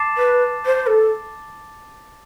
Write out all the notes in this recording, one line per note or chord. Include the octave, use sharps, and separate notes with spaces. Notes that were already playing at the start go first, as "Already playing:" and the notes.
Already playing: A5 D6 A6 C7 E7
B4
C5
A4